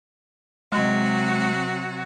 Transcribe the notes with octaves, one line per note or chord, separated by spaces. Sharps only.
C3 F#3 G#3 F#4